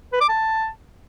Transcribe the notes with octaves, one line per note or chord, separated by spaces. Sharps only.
B4
D6
A5